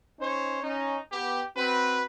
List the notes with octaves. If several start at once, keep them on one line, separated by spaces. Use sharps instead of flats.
C#4 D#4 C5 C#5
C#4 D#4
B3 G4
C4 F#4 B4